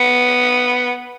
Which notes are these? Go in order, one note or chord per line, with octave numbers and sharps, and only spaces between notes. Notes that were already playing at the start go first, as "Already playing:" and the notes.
Already playing: B3